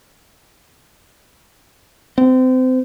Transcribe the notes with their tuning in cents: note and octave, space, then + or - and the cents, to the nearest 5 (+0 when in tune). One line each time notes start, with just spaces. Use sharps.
C4 -30